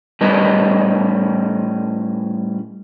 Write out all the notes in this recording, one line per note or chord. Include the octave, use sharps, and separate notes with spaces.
A2 G3 C#4 B4 D#5